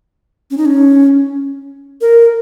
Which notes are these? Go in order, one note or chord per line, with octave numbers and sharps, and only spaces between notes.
C#4
D#4
C#4
A#4